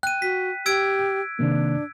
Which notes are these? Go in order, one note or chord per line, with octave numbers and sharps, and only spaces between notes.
G5 F#6 D#7
F#4 B6
G4 E6 G#6 D7
C3 D#3 A#3 D4